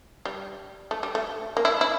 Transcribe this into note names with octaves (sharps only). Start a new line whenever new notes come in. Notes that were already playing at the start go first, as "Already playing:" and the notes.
G3
A3
G3
A3
A#3
E4
E4